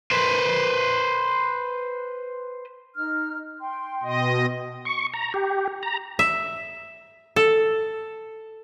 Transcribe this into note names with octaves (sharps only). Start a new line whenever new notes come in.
B4 C5
D#4 F6
G5 C6
B2 D#5
C#6
A#5
G4
A#5
E5
A4